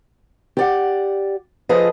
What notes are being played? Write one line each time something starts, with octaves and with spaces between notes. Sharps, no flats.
G4 D5 F#5
F3 F4 G#4 A4 B4 D#5